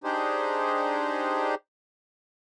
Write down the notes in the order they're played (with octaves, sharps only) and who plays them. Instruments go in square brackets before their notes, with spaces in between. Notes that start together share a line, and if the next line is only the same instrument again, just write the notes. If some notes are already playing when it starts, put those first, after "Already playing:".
[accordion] D4 D#4 G4 G#4 C5